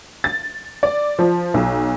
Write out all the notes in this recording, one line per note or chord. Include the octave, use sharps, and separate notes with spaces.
A6
D5
F3
B1